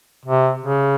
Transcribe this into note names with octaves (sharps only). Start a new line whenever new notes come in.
C3
C#3